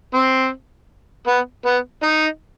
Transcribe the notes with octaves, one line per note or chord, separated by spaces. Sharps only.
C4
B3
B3
D#4